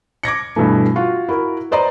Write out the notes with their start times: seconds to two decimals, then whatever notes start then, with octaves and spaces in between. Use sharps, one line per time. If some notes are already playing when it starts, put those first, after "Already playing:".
0.23 D6 G#6 A#6 C#7
0.56 G2 B2 E3 A3
0.96 F4 F#4
1.29 E4 F#4 A#4
1.71 B4 C5 D5 D#5 A#5 C6